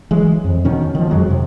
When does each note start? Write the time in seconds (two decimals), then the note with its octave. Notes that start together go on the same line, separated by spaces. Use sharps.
0.11 E3 F#3 G#3
0.44 F2
0.65 B2 D#3 C#4
0.95 D#3 F3
1.10 F2 F#3 G#3
1.28 F2 C3